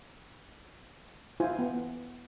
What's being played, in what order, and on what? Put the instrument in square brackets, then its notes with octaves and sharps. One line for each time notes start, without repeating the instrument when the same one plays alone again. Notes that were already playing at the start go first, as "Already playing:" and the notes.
[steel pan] E4 F4 C5 G#5
B3